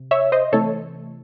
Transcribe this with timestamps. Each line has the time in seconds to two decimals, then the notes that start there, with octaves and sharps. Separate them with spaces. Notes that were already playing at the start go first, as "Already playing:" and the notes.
Already playing: C3
0.11 C#5 E5
0.32 C5 D#5
0.52 C3 E3 A3 A4 C#5